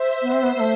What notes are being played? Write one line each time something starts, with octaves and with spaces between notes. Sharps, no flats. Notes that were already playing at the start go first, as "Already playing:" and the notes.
Already playing: C5 E5
B3
C4
B3
B3
A3